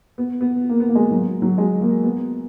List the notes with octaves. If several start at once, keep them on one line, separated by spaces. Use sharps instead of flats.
B3
B3
A#3
B3
A#3
G#3
F#3
F#3
G#3
A#3
B3